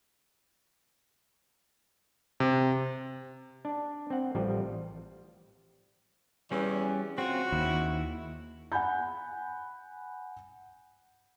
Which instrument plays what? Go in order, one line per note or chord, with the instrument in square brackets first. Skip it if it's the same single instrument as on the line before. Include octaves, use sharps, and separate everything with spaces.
[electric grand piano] C3
[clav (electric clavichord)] D4
C4 F#5
A1 F3 G3 F4
[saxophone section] E2 [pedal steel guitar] G3 C#4
[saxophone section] C#3 F#4 [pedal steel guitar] C4 F4
[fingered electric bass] D#2 [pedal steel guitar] E4
[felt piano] F#5 G#5 B5 G6